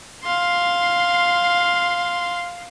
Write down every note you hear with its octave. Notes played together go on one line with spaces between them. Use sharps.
F5 C6